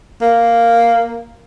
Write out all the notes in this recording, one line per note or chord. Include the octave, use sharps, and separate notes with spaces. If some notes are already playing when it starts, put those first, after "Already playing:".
A#3